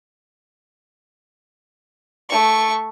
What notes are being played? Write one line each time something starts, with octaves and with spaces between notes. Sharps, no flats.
A3 C#6